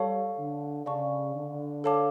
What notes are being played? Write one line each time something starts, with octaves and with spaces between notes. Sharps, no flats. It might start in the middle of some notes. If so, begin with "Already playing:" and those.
Already playing: G3 A4 C#5 F5 A5 C#6
D3
C#3 D5 F5 A5 C#6
D3
A4 C#5 F5 A5 D6